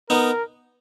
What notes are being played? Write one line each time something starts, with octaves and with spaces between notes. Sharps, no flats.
B3 D#4 A#4